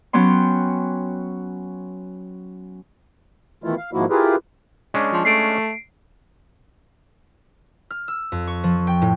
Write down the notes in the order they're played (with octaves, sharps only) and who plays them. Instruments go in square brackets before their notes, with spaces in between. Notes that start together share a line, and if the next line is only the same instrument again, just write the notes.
[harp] F#3 B3 C#4 G5 C6
[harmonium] B2 D#3 E3 A3 E4 F4
F5
G#2 D#3 F3 A#3 E4 F#4
E4 F4 G4 G#4 A#4 B4
[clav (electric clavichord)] G#3 C#4 D4
[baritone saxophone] F3
[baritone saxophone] A3 [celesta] C7 D7
[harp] F6
E6
F2
C#6
F3
G5
A2